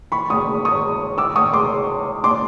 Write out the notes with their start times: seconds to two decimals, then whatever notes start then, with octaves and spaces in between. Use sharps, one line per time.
0.12 B5 C#6
0.30 C#6 D#6
0.65 C#6 D#6
1.18 D6 E6
1.36 C#6 D#6
1.53 C6 D6
2.24 C6 D6